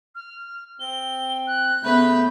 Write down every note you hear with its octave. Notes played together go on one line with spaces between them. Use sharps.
F6
C4 G7
F#6
C#3 A3 B3 B4 G6